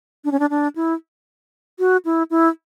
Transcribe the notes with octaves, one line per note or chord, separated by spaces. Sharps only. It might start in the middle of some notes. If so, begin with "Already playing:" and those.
D4
C#4
D4
D4
E4
F#4
E4
E4